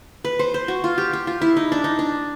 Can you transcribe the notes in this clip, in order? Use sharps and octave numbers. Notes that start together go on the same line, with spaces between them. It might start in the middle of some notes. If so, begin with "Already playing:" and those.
B4
C5
C5
F#4
F4
G4
G4
F4
E4
D#4
D4
D#4
D4